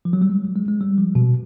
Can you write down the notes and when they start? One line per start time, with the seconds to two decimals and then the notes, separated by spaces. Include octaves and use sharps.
0.05 F3
0.13 F#3
0.22 G3
0.30 G#3
0.56 G#3
0.68 G#3
0.81 G3
0.98 F3
1.15 B2